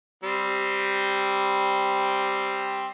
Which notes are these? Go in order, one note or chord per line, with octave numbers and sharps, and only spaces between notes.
G3 C4